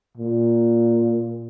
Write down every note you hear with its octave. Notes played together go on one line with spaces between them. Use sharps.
A#2